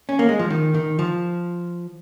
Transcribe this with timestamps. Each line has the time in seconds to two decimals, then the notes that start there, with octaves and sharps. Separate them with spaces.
0.09 C#4
0.19 A#3
0.29 G#3
0.39 F3
0.50 D#3
0.75 D#3
0.99 F3